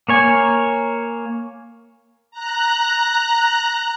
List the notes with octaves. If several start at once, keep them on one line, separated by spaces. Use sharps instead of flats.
A#3 C#5 G#5
A#5 F#6